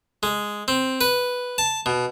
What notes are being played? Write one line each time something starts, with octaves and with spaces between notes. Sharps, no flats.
G#3
C4
B4
A5
B2